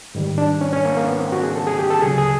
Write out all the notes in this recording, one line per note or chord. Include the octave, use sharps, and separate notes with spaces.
G#2 D#3 G3
D4
C#4
C#4
A#3
A#3
B3
C4
F#4
G#4
A4
G#4
G4
A4
D2 C#3 F#3 G#4
G#4